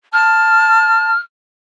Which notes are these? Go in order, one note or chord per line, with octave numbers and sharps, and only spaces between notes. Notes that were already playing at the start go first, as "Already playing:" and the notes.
A5 F6